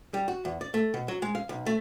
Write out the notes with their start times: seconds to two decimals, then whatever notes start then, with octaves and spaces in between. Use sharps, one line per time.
0.14 G3
0.28 F#4
0.45 E2
0.61 D5
0.74 A3
0.94 B2
1.08 F#3
1.22 G#3
1.35 F5
1.49 B1
1.66 A3